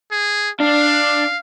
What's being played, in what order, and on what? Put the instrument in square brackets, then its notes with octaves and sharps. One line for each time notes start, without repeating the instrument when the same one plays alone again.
[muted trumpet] G#4
[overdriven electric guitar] D4 [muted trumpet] F5